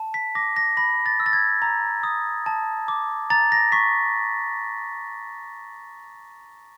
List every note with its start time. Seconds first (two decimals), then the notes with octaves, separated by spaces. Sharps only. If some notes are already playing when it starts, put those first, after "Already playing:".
Already playing: A5
0.14 B6
0.35 D6 A#6
0.56 A#6
0.77 B5 A#6
1.06 A6
1.20 E6
1.26 A6
1.33 G#6
1.62 A#5
2.03 D#6
2.46 A5
2.88 D6
3.30 A#5 A6
3.52 A#6
3.72 C#6 B6